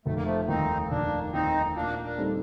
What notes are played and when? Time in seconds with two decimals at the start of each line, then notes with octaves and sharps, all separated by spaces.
0.06 F1 A3
0.15 A#3
0.23 F3 A3
0.48 D#2 D#3 C4 D#4
0.90 F1 A#3 D4
1.32 D#2 D#3 C4 D#4
1.75 A#2 A#3 D4
2.03 A#3 D4
2.18 G3 C4 D#4 A4